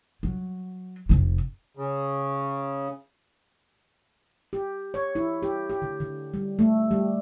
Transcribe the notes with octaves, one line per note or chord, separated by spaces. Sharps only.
F#3
F1 C3
C#3
G4
C#5
E4
G4
G4
D3
D3
G3
A3
G3